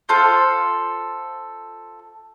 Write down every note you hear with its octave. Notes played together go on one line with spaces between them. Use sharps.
F4 A4 C5